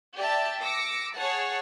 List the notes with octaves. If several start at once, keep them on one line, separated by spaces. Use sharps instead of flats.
G4 D5 E5 A5
D6 E6 A#6 C#7
G#4 C#5 F#5 A5